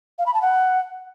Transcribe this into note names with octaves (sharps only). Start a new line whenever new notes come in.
F5
B5
A5
F#5